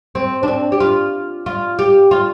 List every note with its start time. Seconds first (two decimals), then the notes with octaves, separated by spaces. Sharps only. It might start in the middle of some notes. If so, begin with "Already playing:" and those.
0.15 C4
0.43 D4
0.48 C4
0.72 G4
0.80 F4
1.46 F4
1.79 G4
2.11 F4